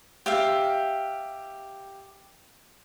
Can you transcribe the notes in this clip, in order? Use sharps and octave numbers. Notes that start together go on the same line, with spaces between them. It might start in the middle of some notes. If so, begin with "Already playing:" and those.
G4 E5 F5